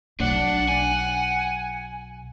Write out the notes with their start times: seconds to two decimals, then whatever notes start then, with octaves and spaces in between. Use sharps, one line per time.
0.20 B1 D4 D5 F#5
0.68 G#5